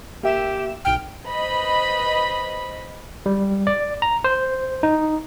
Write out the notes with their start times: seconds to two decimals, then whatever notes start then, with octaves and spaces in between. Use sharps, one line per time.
0.23 A#3 G4 E5 E7
0.85 B1 G5 F6
1.27 B4 C5 D#5 B5
3.26 G3
3.67 D5
4.02 A#5
4.24 C5
4.83 D#4